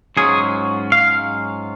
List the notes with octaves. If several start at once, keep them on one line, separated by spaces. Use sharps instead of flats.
G#2 F#3 C#4 F4 G#4
F5